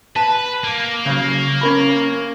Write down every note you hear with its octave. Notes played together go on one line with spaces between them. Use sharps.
B4 A5
A#3
C#3 F#3
C#4 A#4 B5